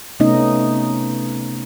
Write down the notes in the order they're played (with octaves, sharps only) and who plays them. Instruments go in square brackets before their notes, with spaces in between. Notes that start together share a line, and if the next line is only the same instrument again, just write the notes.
[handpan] C3 A3 B3 C#4 D#4 D#5